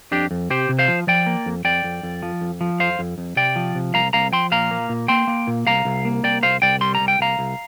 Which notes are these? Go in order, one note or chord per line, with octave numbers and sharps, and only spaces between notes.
F2 D4 G4
F2
C3 G4 C5
C3
C5 F5
F3
F3 D5 G5
A#3
F2
F2 D5 G5
F2
F2
F3
F2
F3
F2 C5 F5
F2
F2
C3 D5 G5
F3
C3
C2 F5 A#5
C2 F5 A#5
F3 G5 C6
A#2 F5 A#5
A#3
A#2
A#3 G5 C6
A#3
A#2
C2 F5 A#5
C2
A#3
C2 D5 G5
C2 C5 F5
C2 D5 G5
G3 C6
A#5
C2
G5
C2 F5 A#5
C2